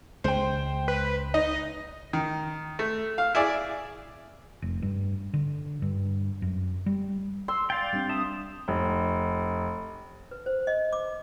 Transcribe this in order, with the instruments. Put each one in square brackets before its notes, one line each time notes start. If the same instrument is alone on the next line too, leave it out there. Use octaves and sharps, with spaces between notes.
[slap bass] C#2 G#3 [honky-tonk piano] C5 G5
[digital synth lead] B4
[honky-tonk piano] D#4 [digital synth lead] D#5
[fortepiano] D#3
A3
F5
E4 G#4 D5
[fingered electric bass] F1
G2
D3
G2
F#2
G3
[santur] C6 [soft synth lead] E6
[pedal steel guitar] D5 F5 G5 [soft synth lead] A6
[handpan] G3 C4 D4
[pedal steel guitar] E5 A5 [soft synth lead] D#6
[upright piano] F1
[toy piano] B4
C5
D#5
D6